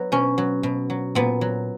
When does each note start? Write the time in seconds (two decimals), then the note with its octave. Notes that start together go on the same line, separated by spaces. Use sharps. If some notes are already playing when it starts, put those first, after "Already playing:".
Already playing: F#3 B3
0.12 B2 C#4
0.38 F#3
0.63 B2
0.90 F#3
1.15 A#2 B3
1.41 F#3